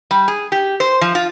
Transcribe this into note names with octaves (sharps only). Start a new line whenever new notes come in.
G3
G#4
G4
C5
F3
F4